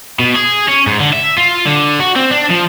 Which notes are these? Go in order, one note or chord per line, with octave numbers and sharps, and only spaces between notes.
B2
G#4
C#4
G#2
D3
E5
F4
D3
F#4
C4
D4
F3